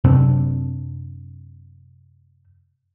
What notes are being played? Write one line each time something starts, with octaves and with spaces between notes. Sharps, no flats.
F#2 C3 C4 D4